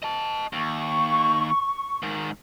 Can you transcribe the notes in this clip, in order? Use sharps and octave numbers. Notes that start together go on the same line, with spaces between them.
D#5 A5
D#2 C#6
G#2 D#3